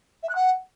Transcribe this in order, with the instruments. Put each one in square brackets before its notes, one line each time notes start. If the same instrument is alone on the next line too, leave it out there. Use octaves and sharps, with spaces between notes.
[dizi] E5
F#6
F#5